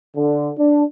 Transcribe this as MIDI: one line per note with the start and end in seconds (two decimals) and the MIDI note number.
0.16 0.50 50
0.58 0.83 62